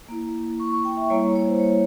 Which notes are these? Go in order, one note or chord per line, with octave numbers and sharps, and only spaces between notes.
A#3 E4
C#6
C#6
G5
E5
G3 A#3 E4 C#5
C#5
C5
C#5